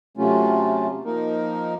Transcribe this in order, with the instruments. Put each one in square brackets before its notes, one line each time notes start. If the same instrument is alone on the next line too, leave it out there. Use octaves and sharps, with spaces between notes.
[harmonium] C3 F#3 A3 C#4 F4
F3 A#3 D#4 A#4